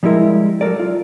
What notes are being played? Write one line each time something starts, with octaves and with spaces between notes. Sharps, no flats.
F3 G3 G#3 E4 A#4
F#3 A4 A#4 D5
F4